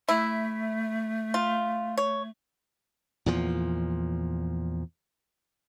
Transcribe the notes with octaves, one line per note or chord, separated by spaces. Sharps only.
A3 E4
F4
C#5
E2 A#2 F3